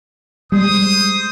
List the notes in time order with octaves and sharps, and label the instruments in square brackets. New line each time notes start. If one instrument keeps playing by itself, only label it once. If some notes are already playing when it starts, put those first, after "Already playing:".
[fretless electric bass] G3 G#3 [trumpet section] C5 D#6